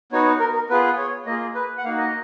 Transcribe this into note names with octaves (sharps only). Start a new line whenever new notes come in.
B3 D#4 F#4 C#5
A#4
A#4
B3 F4 G#4 B4
C#5
A#3 F4 G#4 D#5
B4
F#5
A#3 D#4 F#4 F5
D#5